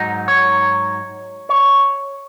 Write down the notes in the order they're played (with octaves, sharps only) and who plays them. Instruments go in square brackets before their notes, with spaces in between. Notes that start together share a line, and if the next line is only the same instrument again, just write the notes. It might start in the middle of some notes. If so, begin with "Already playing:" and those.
Already playing: [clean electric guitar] G#2 F#3 D#4
C#5
C#5